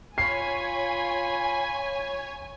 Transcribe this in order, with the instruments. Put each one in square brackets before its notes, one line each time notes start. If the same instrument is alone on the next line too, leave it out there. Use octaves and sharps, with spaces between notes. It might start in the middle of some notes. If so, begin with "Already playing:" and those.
[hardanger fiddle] F4 B5 [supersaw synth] C#5 G#6 [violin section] G#5 [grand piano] C7